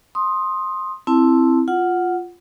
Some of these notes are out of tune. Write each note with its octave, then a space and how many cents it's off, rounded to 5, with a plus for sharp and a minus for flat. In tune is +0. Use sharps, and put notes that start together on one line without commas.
C6 +15 D#6 +0
C4 +0 E4 +0 A5 +0
F4 +0 F#5 +0